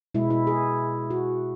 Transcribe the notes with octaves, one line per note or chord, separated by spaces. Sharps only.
B2 G#3 E4
E4
G#4
F#4